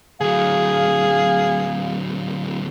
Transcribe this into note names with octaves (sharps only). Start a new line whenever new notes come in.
D2 F#3 G#4 F5